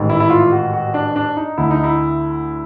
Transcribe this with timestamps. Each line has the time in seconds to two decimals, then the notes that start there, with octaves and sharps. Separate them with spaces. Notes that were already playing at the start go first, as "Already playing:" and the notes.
Already playing: A1 G#2 D#3
0.09 E4
0.20 E4
0.30 F4
0.52 F#4
0.74 F#4
0.94 D4
1.16 D4
1.37 D#4
1.58 D2 D3 E4
1.71 D#4
1.84 E4